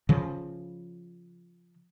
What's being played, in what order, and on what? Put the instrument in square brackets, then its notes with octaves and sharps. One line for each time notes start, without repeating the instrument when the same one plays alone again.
[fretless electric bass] C#3 F3